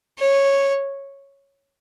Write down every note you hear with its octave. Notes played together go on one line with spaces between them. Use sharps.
C#5